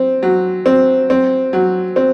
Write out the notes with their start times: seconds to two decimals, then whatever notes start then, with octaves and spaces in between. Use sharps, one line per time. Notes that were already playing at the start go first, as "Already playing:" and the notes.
Already playing: C4
0.23 F#3
0.66 C4
1.10 C4
1.53 F#3
1.96 C4